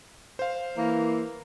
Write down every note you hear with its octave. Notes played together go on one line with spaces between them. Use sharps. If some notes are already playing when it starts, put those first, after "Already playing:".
C5 F5
E3 A#3